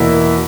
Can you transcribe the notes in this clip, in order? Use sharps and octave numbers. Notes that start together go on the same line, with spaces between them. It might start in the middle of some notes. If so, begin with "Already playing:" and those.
Already playing: E2 B2 A#3 E4